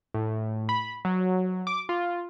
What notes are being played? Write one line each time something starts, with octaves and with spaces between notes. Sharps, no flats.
A2
B5
F#3
D6
F4